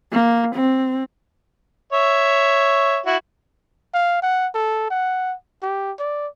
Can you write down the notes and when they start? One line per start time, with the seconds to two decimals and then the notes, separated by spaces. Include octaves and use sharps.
0.12 A#3
0.55 C4
1.92 C#5 E5
3.06 E4 F#4
3.94 F5
4.22 F#5
4.54 A4
4.90 F#5
5.62 G4
5.99 D5